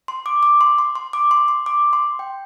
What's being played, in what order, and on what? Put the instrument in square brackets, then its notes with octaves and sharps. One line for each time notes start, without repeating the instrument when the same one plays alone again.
[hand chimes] C6
D6
D6
C6
C6
C6
D6
C6
C6
D6
C6
G5